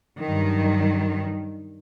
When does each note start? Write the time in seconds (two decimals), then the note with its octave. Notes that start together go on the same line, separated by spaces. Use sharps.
0.19 G2 D#3 F#3